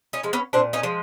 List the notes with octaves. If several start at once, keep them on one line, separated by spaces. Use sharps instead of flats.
C#4 D#4
F3 G#3
B3 C#4
A#2 C4 D4
C#4 D#4
F3 G#3